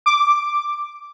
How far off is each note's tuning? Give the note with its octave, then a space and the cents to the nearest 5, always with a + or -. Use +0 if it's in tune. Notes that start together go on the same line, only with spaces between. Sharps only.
D6 +0